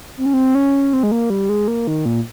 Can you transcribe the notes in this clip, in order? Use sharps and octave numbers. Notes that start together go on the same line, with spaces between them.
C4
C#4
C4
C#4
C4
G#3
A#3
G3
G#3
A#3
D#3
A#2